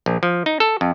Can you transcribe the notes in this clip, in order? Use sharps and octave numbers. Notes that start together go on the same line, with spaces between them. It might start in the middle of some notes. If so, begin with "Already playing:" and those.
A#1
F3
D#4
A4
F2